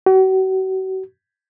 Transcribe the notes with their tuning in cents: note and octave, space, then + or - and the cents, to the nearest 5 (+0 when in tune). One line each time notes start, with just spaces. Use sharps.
F#4 +40